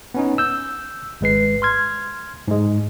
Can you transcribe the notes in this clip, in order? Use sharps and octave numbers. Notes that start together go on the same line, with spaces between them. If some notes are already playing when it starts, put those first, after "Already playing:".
B3 C#4 D#4
E6 G6
G#1 G#3 B4 C7
C6 F6 G#6
G#2 G#3